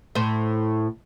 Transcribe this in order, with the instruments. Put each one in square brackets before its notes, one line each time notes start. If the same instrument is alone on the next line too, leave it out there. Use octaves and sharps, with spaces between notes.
[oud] A2 C5